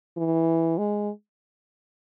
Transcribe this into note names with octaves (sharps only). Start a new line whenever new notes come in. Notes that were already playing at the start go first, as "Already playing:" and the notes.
E3
G#3